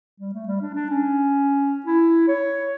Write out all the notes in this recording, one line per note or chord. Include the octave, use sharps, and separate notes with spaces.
G3
A3
G3
D4
D4
C#4
E4
C#5